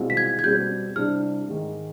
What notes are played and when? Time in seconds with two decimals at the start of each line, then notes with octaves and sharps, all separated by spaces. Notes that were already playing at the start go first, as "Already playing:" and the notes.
Already playing: C2 B2 G#3 C4 F4
0.10 B6
0.17 G#6
0.39 G#6
0.43 B2 G3 C4 G6
0.96 C2 C3 G3 D4 F6
1.48 G#2 D#3 G#3